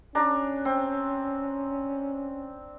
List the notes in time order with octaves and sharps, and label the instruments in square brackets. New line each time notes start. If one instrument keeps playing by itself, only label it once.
[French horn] C#4 [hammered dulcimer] D4 A#5
[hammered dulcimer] C4